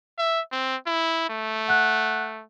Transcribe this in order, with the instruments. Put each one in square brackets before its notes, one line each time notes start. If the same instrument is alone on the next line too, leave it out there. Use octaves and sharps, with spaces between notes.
[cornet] E5
C4
E4
A3
[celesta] F#5 F#6